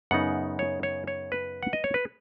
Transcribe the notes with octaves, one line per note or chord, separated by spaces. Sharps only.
F#2 C#3 B3 D#4 F#5
C#5
C#5
C#5
B4
F#5
D#5
C#5
B4